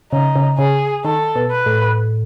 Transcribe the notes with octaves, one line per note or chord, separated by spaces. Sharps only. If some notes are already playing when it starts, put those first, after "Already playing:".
C#3 D#4
C#3
C#3 G#4
D#3 A4
B2
B4
A2